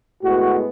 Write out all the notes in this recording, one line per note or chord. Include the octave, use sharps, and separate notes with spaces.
A2 G#3 B3 F#4